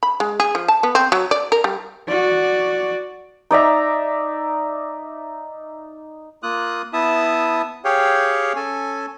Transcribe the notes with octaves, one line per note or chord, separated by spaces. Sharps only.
B5
G#3
G#4
F3
A5
B3
C4
F#3
D5
A#4
G3
F#4 D5
D#4 D5 E5 A#5
A#3 F4 D#6 F#6
B3 E4 E5 A5 D#6
G4 G#4 C#5 F5 G5
C#4 A4 G#5